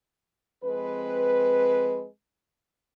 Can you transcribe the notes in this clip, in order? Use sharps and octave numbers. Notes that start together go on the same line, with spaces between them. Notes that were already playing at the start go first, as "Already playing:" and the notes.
F2 G#3 C4 B4